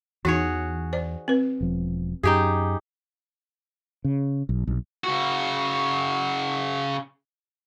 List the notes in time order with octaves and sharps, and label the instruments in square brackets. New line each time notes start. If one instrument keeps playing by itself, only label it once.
[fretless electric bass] E2 [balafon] E3 D#4 [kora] F#4 G#4 C#5
[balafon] C5 D5
C4 B4
[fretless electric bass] E1 F3
[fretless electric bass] F#2 [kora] D#4 G4 G#4
[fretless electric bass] C#3
B1
B1
[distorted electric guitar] C#3 F#4